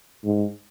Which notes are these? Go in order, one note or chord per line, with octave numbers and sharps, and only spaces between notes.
G#2